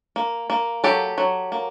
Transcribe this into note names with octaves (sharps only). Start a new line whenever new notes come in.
A#3
A#3
F#3 G4 A4
F#3
A#3